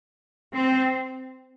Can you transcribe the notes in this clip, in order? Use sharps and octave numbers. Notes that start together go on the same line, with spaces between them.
C4